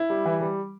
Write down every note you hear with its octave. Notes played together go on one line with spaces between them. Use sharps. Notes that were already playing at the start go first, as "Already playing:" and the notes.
Already playing: E4
G3
E3
G3